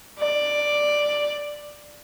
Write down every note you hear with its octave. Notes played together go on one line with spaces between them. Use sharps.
D5